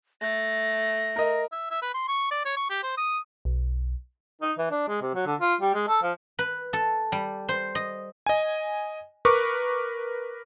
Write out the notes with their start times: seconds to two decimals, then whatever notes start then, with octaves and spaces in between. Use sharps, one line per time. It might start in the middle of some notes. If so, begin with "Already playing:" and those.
0.21 A3 A#6
1.16 A#4 D#5
1.52 E5
1.71 E5
1.82 B4
1.95 C6
2.08 C#6
2.31 D5
2.45 C#5
2.57 C#6
2.70 G4
2.83 C5
2.98 D#6
3.45 B1
4.42 D#4
4.58 E3
4.71 D4
4.89 G#3
5.02 C3
5.15 F#3
5.26 D3
5.40 F4
5.61 G3
5.75 G#3
5.88 A4
6.03 F3
6.39 B4
6.73 A4
7.12 G3
7.49 C5
7.75 D#5
8.26 D#5 G#5
9.25 A#4 B4 C#6 D6